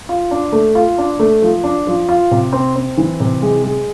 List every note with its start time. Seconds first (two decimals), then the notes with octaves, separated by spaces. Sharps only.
0.09 F4
0.31 D4
0.52 A3
0.75 F4
0.98 D4
1.19 A3
1.42 F3
1.64 D4
1.87 F3
2.09 F4
2.31 C3
2.53 C4
2.76 C4
2.98 E3
3.20 C3
3.42 G#3
3.64 G#3